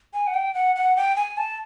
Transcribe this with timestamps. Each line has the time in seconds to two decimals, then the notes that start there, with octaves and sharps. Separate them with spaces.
0.13 G#5
0.27 F#5
0.34 G5
0.54 F#5
0.76 F#5
0.97 G5
1.16 G#5
1.37 A5